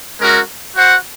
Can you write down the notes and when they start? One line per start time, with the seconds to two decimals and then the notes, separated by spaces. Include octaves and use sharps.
0.20 G#3 C#4 F#4 A#4
0.76 F#4 C5 F#5